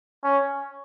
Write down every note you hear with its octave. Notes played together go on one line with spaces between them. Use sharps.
C#4